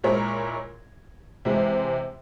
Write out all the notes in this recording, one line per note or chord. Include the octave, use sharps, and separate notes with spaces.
A#2 G#3 E4 A#4 C#5
C3 E3 G#3